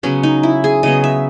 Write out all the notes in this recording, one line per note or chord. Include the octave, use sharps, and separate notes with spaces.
C#3 F#3 B3 C#4
D#4
E4
G#4
C#3 F#3 B3 D#5
E5